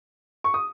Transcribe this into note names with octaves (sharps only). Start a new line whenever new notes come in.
C#6
D#6